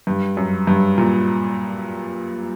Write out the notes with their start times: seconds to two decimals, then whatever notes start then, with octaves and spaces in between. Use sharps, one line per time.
0.07 G2
0.37 F#2
0.67 G2
0.98 A#2